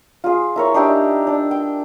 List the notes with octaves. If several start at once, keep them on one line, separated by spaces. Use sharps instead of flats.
F4 G#4
E4 A#4 C#5
D4 D#4 G4 E5
D4
G5